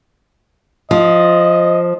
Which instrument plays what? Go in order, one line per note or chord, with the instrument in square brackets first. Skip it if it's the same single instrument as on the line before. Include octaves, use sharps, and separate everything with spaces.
[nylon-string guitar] F3 [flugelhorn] D#5